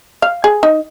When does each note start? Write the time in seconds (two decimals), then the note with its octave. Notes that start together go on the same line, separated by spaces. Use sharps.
0.22 F5
0.44 G#4
0.63 D#4